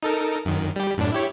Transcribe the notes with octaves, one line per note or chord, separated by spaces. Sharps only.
D#4 A4 A#4
F#2 D#3
G3 G4
F#2 A2 D4
E4 G4 C#5